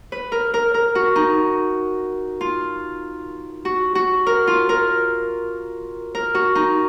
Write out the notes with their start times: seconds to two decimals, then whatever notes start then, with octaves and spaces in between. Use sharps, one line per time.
0.12 B4
0.32 A#4
0.54 A#4
0.74 A#4
0.95 F#4
1.16 D#4
2.41 F4
3.65 F#4
3.95 F#4
4.27 A#4
4.47 F4
4.69 A#4
6.15 A#4
6.35 F#4
6.55 D#4